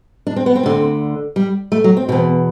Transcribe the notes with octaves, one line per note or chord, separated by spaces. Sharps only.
D4
C4
B3
C4
D2 D3
G3
A3
F#3
C4
E2 B2 C4